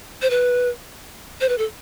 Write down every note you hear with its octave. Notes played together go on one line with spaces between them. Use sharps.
C5
B4
C5
B4
A4